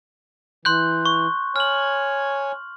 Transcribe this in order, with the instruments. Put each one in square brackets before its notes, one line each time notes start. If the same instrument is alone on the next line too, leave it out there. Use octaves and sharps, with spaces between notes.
[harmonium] E3 [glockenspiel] C6 F#6 G6
[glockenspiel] C#6
[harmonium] C#5 G#5 [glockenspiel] F6 F#7